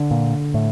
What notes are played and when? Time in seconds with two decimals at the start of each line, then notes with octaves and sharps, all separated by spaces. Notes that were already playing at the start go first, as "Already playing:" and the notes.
Already playing: D3
0.11 A#2
0.54 A2